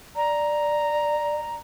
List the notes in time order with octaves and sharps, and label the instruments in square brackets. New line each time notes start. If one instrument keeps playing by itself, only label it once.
[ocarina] D5 [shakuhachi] A#5